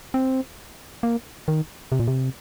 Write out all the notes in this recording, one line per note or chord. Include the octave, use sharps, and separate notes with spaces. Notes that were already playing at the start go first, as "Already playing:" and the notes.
C4
A#3
D#3
C3
A#2
C3